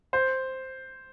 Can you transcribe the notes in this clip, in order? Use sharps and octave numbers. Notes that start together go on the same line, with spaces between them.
C5